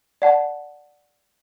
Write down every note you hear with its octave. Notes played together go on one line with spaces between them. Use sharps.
D5 F#5 A5